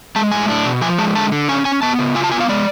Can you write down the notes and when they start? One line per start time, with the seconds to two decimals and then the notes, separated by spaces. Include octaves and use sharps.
0.16 G#3 A5
0.32 A2 G#5
0.48 D4
0.66 B2
0.82 F3 G#5
0.98 G#3 A5
1.15 D3 A5
1.32 D3
1.49 C#4 G#5
1.65 C#4 G#5
1.82 B3 A5
1.99 C#3
2.15 F4 G#5
2.24 A5
2.32 B3 G#5
2.40 F5
2.49 G#3 D5